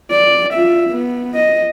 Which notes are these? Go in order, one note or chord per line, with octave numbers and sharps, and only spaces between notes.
D5
F4 E5
B3
D#5